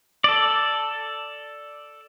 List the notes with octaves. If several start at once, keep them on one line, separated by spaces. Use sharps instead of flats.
A4 D5